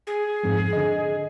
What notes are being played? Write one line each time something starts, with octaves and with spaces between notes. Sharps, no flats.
G#4
F2 G#2
D3 D#5